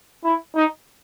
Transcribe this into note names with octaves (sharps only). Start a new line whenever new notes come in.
E4
D#4